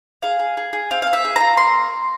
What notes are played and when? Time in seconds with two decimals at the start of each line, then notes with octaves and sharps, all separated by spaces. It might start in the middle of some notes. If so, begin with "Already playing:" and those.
0.22 G#4 F5
0.39 G#4
0.57 G#4
0.73 G#4
0.91 C4 F5
1.02 C4 F5
1.13 E5
1.25 G#4
1.36 F4 A#5
1.57 A#3 C6